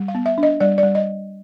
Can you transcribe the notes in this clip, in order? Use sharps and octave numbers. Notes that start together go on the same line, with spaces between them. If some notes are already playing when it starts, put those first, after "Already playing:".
Already playing: G3
F5
B3
E5
D4
D#5
G3 D5
D5
G3
D#5